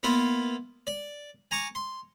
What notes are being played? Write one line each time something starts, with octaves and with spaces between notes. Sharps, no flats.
A#3 B3 E4 F4
D5
G#5 A#5 C#6 D6
C6